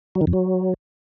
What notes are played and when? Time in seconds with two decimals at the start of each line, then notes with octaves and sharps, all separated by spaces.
0.15 F#3
0.21 D#3
0.27 F2
0.33 F#3